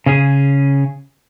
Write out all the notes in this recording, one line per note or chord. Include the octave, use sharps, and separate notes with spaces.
C#3 C#4 G#4